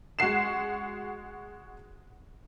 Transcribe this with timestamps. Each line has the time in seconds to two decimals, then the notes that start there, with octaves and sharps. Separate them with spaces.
0.19 G#3 F#4 F#5 C7 E7